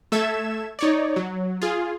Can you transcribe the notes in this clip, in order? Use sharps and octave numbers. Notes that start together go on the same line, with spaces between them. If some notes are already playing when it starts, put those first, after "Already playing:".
A3 A4 E5 G#6 E7
D#4 C#5 D5
F#3
F4 G#4